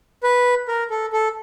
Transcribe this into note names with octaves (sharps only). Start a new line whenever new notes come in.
B4
A#4
A4
A4